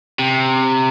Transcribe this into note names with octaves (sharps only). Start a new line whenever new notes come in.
C3